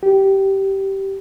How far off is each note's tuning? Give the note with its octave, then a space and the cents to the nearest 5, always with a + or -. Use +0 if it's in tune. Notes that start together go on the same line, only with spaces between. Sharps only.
G4 -15